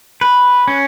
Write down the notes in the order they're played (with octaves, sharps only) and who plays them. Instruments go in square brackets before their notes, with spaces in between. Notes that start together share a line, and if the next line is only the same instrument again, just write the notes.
[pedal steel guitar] B4
C#4